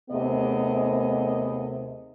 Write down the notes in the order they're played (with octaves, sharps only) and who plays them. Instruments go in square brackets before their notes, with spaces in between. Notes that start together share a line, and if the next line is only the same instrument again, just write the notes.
[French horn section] D#2 C3 A3 B3 G#4 D#5